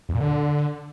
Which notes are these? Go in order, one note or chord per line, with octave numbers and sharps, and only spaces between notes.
E2
A#2
D3